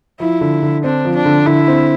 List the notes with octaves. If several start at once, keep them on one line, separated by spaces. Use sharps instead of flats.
F3 E4
D3
D3
C4 D4
F3
D4
D3
D3 E4
C4